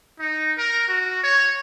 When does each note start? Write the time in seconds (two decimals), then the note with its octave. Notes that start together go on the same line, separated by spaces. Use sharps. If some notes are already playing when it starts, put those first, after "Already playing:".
0.20 D#4
0.58 A#4
0.88 F#4
1.23 C#5